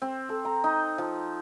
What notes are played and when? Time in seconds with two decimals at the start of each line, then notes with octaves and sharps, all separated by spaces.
0.02 C4
0.29 A4
0.45 A#5
0.64 D#4
0.98 F3